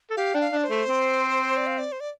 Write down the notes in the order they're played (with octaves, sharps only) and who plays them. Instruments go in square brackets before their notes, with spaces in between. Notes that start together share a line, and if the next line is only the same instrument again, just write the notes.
[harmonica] A4
[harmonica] G4 [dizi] F5
[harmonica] D4 [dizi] G5
[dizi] F5
[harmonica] D4
[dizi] D5
C5
[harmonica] A3
C4
[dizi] D5
F5
D5
C5
D5